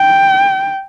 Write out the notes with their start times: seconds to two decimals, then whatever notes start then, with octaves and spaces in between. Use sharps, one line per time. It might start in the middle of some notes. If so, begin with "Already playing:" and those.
Already playing: G5